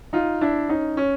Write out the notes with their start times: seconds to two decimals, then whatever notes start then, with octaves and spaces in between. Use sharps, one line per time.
0.13 D#4 F4
0.41 D4 E4
0.69 C#4 D#4
0.97 C#4